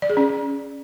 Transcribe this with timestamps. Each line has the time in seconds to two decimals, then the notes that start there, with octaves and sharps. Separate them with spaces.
0.02 D5
0.10 G#4
0.17 C#4